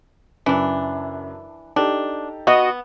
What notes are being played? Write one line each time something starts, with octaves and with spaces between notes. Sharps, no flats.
F#2 C#3 E3 D4
D4 D#4 G4 A4
B3 F#4 D#5